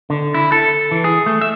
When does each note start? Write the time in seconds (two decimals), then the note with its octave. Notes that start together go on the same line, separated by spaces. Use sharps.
0.10 D3
0.34 E4
0.52 A4
0.91 E3
1.04 G#4
1.26 A3
1.41 E5